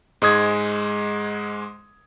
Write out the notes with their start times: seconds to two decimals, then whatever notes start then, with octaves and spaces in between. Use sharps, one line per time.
0.22 G#2 G#3 D#6 G#6